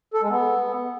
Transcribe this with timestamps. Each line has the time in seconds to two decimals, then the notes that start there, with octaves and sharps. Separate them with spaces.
0.14 A4
0.22 G#3
0.29 B3